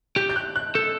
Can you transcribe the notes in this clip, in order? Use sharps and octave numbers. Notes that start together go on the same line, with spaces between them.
G4 G6
G6
F#6
F#6
A4 G6